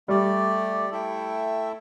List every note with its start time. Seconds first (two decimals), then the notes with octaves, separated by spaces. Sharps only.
0.08 G3 A3 G4 D5
0.90 A3 E4 A4 E5 G5